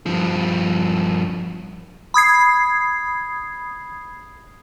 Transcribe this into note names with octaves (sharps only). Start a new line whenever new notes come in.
G2 F3
B5 D#6 G#6 C7